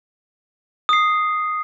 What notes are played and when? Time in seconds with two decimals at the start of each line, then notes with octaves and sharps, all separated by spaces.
0.89 D#6 C7